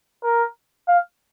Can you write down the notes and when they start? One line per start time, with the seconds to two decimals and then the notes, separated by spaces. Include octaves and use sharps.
0.24 A#4
0.88 F5